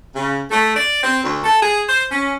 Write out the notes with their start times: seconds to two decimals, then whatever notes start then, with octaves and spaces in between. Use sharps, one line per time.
0.16 C#3
0.51 A3
0.76 D5
1.04 C4
1.24 D2
1.44 A4
1.62 G#4
1.89 C5
2.11 C#4